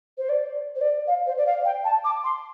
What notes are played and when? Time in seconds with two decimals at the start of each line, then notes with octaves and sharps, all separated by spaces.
0.18 C5
0.29 D5
0.75 C5
0.81 D5
1.07 F5
1.26 C5
1.37 D5
1.46 F5
1.65 G5
1.84 A5
2.04 D6
2.24 C6